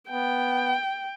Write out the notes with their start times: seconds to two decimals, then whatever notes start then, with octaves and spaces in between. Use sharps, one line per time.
0.10 B3 G5